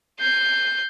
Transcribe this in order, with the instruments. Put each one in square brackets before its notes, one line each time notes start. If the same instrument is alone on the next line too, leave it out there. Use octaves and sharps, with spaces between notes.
[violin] G6 C7